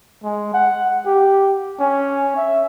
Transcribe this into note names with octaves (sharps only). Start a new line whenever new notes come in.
G#3
F#5
G4
C#4
E5